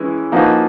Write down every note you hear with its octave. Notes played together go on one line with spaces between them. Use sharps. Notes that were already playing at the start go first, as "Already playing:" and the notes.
Already playing: E3 G#3 C#4 E4
F3 A#3 D#4 F#4 B4